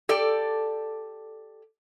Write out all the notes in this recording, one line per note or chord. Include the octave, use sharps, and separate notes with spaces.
G4 A4 D5